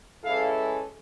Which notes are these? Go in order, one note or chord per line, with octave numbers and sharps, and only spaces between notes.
E3 G#3 C#4 E4 A4 F5